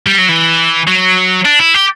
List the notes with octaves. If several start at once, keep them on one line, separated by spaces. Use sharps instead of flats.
G3
F#3
E3
F#3
D4
E4
G4